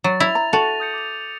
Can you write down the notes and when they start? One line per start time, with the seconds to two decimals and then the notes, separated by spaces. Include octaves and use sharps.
0.04 F#3 A6
0.20 E4 A#6 F7
0.35 A#5
0.53 F#4 A4 A6 D#7 F7
0.80 D#6 G6 C#7
0.94 D6 F7